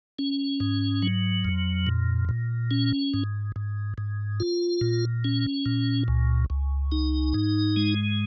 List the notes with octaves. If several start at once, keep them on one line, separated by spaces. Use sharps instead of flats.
C#4
G#2
F#3
F2
A#2
A#2
C#4
G#2
G#2
G#2
F4
A#2
C#4
A#2
C#2
C#2
D#4
G#2
G#3